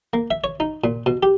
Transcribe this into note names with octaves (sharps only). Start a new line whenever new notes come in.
A#3
E5
C#5
D#4
A#2
B2
G4